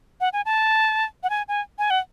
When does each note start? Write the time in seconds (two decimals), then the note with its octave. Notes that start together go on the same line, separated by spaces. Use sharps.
0.21 F#5
0.33 G#5
0.45 A5
1.23 F#5
1.30 G#5
1.48 G#5
1.79 G#5
1.90 F#5